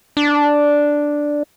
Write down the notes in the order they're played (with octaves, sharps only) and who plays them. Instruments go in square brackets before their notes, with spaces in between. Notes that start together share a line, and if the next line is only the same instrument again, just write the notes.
[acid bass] D4